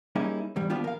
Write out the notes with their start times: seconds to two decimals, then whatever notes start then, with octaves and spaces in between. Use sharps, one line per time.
0.15 G3 A#3 C#4 D#4 E4 G#4
0.56 E2 G#2 G3
0.70 D#2 F3 B3 D4 F4 G4
0.84 A#4 F5